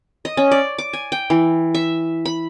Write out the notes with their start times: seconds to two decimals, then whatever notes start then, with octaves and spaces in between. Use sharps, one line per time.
0.25 D#5
0.37 C#4
0.51 D5
0.78 D6
0.93 G#5
1.12 G5
1.30 E3
1.75 E5
2.25 B5